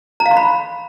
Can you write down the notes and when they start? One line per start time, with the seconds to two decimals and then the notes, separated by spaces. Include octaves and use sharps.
0.20 A#5
0.26 F5
0.31 C6
0.37 B5